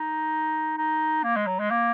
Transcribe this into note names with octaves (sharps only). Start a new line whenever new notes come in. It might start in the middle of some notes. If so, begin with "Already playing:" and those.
Already playing: D#4
D#4
A#3
G#3
F#3
G#3
A#3